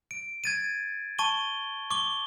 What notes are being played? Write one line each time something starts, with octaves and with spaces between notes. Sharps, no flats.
D7
G#6 A6 D#7
A5 C#6 D#7 G7
C#6 D6 G7